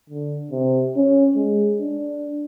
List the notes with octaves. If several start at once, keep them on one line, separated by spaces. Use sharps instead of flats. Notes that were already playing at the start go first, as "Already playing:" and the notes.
D3
C3
C#4
G#3
D4